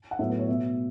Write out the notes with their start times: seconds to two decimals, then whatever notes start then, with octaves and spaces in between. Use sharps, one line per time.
0.11 F#5
0.19 A2 F#3 B3 E5
0.30 B4
0.39 C#5
0.48 B2 B3 E5